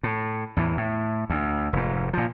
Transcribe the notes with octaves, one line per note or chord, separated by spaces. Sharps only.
A2
E2 A2 E3
A2
D2
F1 G#2
A#2 F3